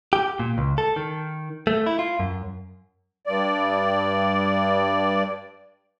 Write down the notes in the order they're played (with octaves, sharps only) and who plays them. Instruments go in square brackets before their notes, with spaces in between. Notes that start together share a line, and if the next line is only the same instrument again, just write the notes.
[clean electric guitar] G4
A#2
C#2
A4
D#3
A3
E4
F4
F#2
[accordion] G2 D5